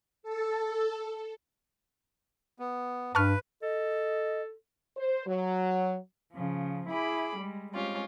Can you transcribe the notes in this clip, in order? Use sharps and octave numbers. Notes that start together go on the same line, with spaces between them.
A4
B3
G2 B4 A5 C#6 F6
A4 D#5
C5
F#3
C#3 F3
E4 G#4 B5 D6
G3 G#3
G3 G#3 C4 C#4 F4 G4